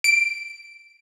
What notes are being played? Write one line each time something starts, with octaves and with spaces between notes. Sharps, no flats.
D7